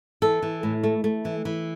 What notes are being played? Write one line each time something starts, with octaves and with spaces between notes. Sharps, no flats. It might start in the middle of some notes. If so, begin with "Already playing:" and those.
E3 A4
E3
A2
A3
A3
E3
E3